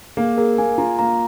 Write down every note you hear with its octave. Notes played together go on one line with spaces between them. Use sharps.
A#3 G#4
G#4 A#4
A#3 G#5
F4 A#5
A#3 A#5